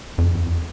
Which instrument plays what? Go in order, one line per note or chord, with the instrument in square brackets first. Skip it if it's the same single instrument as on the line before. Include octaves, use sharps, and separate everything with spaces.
[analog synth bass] F2